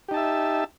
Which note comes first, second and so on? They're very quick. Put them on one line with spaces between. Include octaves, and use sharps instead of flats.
G4 D#4 A5 E5